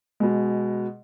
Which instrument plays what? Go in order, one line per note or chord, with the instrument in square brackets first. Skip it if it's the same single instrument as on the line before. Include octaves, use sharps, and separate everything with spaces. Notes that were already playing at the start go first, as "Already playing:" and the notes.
[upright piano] B2 G#3